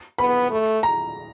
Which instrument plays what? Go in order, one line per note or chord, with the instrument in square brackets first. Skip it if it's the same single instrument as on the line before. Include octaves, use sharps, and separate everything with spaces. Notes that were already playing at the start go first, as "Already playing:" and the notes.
[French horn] B3 [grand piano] B5
[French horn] A3
[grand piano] A#5